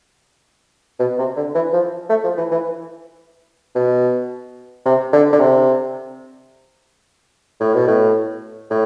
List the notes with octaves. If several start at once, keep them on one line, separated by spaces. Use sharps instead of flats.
B2
C3
D3
E3
F3
A3
F3
E3
E3
B2
C3
D3
D3
C3
A2
B2
A2
A2